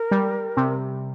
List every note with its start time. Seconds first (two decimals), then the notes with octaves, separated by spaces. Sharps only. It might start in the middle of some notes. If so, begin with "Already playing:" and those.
Already playing: A#4
0.11 G3
0.57 C3